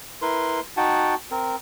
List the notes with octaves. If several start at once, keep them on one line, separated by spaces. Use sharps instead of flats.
E4 A#4 B4 C6
D#4 F#4 F#5 G5 A5
C4 A#4